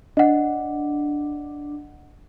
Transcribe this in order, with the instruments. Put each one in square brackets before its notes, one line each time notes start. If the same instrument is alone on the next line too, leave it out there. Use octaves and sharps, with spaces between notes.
[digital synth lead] D4 [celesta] D#5 F#5